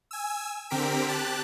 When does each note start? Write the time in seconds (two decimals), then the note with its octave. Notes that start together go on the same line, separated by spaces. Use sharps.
0.11 G#5 E6
0.70 D3 C4 G4 A#4 B6 D7
1.07 G4 A5 F#6